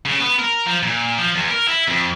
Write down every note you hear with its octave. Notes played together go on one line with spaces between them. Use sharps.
C#3
B3
A#4
F3
A#2
F3
E2
A#4
E4
F2